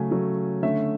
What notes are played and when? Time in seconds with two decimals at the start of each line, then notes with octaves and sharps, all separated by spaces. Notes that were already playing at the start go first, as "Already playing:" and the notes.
Already playing: C#3 F#3 A3 C#4 G#5
0.11 C#3 F#3 A3 C#4
0.63 D3 A3 C#4 E5